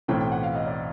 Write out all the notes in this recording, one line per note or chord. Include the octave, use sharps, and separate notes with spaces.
B1 A2 E3 A3 C4 G5
G5
F#5
F5
D#5
D5